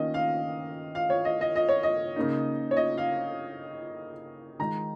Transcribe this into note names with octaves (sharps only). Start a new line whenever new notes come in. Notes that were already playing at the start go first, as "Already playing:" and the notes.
Already playing: D#3 A#3 C#4 D#5
F5
F5
C#5
D#5
D#5
D#5
C#5
D#5
C#3 A#3 D#4
C#5
D#5
F5
D#3 G#3 D#4 A#5